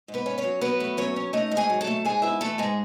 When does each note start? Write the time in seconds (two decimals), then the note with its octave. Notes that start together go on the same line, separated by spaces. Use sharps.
0.08 G#2
0.14 B3 B4
0.26 C#4
0.38 C#4 C#5
0.44 F#3
0.61 F#3 B3 B4
0.80 A3
0.97 F#3 C#4 C#5
1.16 C#4
1.33 A3 D#4 D#5
1.51 G#2
1.57 G#4 G#5
1.70 F#3
1.81 A4 A5
1.87 A3
2.05 G#2 G#4 G#5
2.22 B3 E4 E5
2.41 E3 A3 A4
2.58 G#2 G#3 G#4